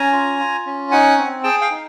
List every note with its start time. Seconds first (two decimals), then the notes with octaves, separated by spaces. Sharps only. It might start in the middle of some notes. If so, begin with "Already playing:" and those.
Already playing: C#4 G#5 A#5
0.12 F4
0.39 F4
0.66 C#4
0.91 D#4 F#5 G#5
1.18 C4
1.44 G#4 G5 A5
1.61 F5 G5
1.71 D#4